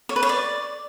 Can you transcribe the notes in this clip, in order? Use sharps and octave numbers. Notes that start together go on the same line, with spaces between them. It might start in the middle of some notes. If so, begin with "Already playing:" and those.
C#5
B4
C#5
D5